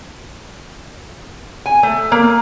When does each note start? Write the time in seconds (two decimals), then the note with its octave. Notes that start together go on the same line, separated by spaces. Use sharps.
1.66 G#5
1.83 A3
2.12 A#3